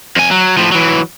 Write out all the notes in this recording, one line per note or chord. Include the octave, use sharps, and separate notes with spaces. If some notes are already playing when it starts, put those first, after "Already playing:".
F2 G#5
F#3
A2 F3
E3 F#3